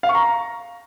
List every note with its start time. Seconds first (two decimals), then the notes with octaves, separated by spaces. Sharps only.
0.03 F5
0.09 C#6
0.15 A#5